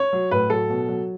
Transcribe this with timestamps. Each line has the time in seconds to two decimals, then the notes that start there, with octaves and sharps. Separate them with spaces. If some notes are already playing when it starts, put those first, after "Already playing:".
Already playing: C#5
0.13 F#3
0.31 A2 B4
0.50 F#3 A4
0.70 B2
0.89 F#3